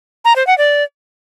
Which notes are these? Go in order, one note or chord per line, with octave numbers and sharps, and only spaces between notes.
A#5
C5
F#5
D5